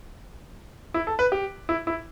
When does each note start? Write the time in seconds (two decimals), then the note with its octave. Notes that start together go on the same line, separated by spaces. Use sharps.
0.94 E4
1.07 A4
1.19 B4
1.32 G4
1.69 E4
1.87 E4